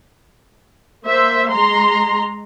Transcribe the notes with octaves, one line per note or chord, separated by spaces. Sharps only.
A#3 C5 E5
G#3 A#5 C6